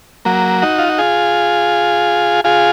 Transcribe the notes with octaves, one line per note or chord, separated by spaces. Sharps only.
F#3 A#3
D#4 F#4
F4
F#4
F4 G#4
F4 G#4